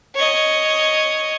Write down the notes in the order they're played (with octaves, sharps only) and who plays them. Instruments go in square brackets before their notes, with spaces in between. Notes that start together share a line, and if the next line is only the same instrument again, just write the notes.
[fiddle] C#5 D#5